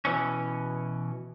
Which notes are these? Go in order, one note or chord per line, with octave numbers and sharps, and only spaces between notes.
B2 E3 C#4